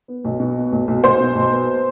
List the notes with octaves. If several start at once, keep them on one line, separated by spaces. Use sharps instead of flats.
B3
B1
B2
B3
B1
B1
B1 C5 C6
B2
B1
B3